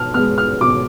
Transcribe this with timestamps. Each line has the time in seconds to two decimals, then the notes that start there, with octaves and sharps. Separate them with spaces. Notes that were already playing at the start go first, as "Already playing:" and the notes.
Already playing: B2 A5 F6
0.14 G#3 B3 F6
0.38 F6
0.61 B2 D6